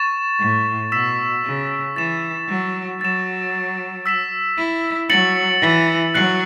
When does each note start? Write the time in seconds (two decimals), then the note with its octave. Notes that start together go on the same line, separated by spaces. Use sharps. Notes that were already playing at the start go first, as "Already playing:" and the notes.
Already playing: C#6 A6 E7
0.39 A2
0.92 B2 E6 B6 E7
1.44 C#3
1.96 E3 A6 E7
2.48 F#3
3.01 F#3 A6 E7
4.06 E6 B6 E7
4.58 E4
5.09 F#3 A6 C#7 F#7
5.61 E3
6.14 F#3 F#6 C#7 F#7